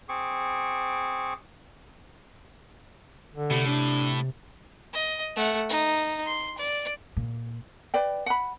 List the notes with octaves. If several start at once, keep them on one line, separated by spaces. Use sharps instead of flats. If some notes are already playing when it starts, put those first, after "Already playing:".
C4 G#4 C#6 D6
D3
A2 C3
D4
D#5
A3 F#5
D#4
C6
D5
A#2
B4 D5 G5
F#5 B5